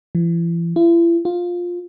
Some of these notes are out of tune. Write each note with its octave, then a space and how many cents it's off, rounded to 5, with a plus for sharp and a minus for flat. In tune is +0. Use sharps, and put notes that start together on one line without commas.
E3 +40
E4 +40
F4 +10